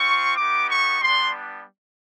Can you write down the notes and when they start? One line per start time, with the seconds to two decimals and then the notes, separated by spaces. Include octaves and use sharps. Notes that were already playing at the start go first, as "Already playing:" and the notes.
Already playing: C4 F4 C#6
0.37 B3 D#4 G4 D6
0.69 C#6
1.01 G3 B3 D4 C6